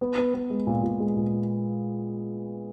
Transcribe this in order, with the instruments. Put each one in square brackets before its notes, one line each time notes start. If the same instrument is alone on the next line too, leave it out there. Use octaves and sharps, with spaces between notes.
[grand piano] B3
B3
B3
G#3
A#2
A#2
G#3
A#2